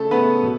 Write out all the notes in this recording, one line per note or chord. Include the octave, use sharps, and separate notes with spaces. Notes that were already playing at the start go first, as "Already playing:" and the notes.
Already playing: C#3 A3 A4
C#3 A3 B3 B4
B2